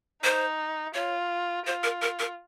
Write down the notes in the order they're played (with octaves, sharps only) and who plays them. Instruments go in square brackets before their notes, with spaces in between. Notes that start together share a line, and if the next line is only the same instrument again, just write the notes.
[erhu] D#4 [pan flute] C5
[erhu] F4 [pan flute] C#5
[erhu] F4 [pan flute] C5
[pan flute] A#4
A#4
A#4